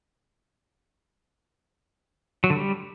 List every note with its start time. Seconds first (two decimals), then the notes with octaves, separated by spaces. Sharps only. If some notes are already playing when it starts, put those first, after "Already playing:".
2.44 F#3
2.50 D3
2.56 G3